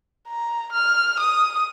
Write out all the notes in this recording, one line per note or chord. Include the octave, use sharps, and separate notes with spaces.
A#5
F6
D#6